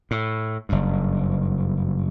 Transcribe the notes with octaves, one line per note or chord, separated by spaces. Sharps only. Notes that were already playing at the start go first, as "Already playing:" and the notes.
A2
F#1 G2